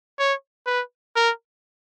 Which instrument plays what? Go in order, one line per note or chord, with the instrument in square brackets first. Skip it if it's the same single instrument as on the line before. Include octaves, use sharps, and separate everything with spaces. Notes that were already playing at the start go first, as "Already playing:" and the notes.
[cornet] C#5
B4
A#4